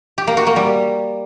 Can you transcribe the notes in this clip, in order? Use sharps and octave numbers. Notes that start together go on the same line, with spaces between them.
G4
A#3
F#4
A#3
G3